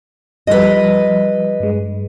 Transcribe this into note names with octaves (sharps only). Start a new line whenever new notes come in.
F3 G3 B4 D#5
G2 G#3